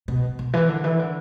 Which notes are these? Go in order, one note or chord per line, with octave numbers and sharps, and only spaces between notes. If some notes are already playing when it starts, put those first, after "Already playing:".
B2
B2
E3
D3
E3
D3